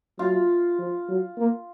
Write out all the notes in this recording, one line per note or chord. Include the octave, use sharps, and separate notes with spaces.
F#3 F4
F3
F#3
A#3